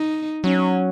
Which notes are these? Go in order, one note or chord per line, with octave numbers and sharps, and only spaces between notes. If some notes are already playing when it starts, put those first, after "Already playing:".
Already playing: D#4
F#3 C#4